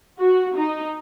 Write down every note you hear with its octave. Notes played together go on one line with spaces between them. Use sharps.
F#4
D#4